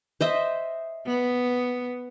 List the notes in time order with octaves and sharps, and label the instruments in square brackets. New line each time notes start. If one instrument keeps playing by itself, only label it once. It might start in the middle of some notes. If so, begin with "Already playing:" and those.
[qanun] C5 D#5 E5
[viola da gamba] B3